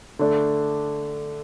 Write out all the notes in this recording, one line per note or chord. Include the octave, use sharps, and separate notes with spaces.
D3 A3 D4